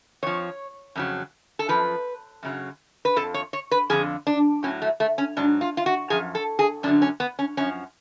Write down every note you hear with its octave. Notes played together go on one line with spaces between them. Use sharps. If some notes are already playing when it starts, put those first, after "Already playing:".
F2 F3 C#5
F2 C#3 F#3
A4
F#2 F3 B4
F#2 C#3 F#3
B4
F2 F3 A4
C#5
C#5
B4
F2 D3 F3 G#4
D4
A2 F#3 C#4
A3
A3
C#4
G#2 F#3 D4
F4
F4
F#4
F#2 F3 G#4
A4
G#4
F#2 D3 F#3 D4
C#4
B3
C#4
F#2 F3 C#4